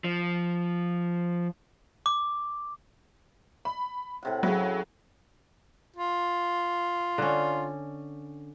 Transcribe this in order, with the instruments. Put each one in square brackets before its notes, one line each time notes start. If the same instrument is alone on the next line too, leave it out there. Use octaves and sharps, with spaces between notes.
[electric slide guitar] F3
[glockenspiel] D6
[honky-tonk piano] B5
[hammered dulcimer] A2 C3 F#5
[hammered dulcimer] C#3 B5 [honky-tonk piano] F#3
[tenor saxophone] F4
[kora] D3 C#4